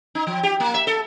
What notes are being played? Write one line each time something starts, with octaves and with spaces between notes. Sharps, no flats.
D#4
F3
G4
A#3
E5
A4